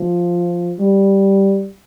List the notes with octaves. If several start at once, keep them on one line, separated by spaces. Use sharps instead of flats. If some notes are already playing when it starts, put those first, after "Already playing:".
Already playing: F3
G3